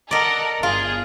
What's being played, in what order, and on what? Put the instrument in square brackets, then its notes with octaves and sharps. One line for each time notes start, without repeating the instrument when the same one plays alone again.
[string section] A4 A#4 F#5 [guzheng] D5 D#5
[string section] G1 G#4 [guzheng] F4